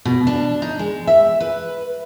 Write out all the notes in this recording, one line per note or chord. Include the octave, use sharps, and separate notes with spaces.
B2
D4
D#4
G#3
E5
B4